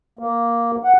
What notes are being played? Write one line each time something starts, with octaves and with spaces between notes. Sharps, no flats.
A#3
F#5